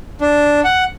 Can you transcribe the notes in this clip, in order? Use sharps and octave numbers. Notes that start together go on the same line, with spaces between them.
D4
F#5